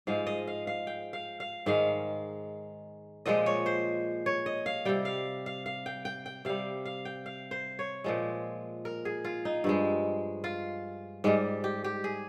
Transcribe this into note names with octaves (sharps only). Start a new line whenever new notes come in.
G#2 F3 G#3 F5
D#5
F5
F5
G5
F5
F5
G#2 D#3 G#3 F5
A#2 F3 G#3 D#5
C#5
C5
C#5
D#5
F5
C3 G3 G5
F5
F5
F5
G5
G5
G5
C3 G3 F5
F5
G5
F5
C5
C#5
A#2 F3 G#3
A#4
G#4
F4
D#4
G2 F3 G#3
F4
G#2 G3 G#3
G4
G4
G#4